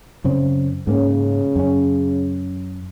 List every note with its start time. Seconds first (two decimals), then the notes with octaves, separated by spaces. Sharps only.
0.24 F#2 C#3 C4
0.87 G#2 C#3 A#3 C#4
1.56 F#2 C#4